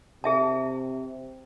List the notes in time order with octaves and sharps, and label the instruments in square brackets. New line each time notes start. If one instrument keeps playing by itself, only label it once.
[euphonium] C3 [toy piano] G#4 E5 A5